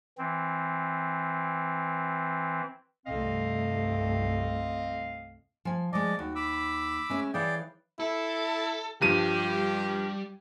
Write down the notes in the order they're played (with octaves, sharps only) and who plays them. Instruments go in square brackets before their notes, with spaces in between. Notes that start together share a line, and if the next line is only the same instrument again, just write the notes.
[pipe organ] E3 C4
[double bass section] C2 G2 A3 [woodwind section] C4 D#5 F5
[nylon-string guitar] F3 G#5
[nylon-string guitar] F3 G#3 [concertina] D5 D#5 D6
[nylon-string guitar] D#2 [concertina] F#4
[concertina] B5 D6 E6
[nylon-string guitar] G#3 C#4 E5
[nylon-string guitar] E3 C#5 F5 [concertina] G#4 D5 G5
[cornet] E4 [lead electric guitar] A4
[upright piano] G2 F3 D#7 [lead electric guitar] G3 [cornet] G4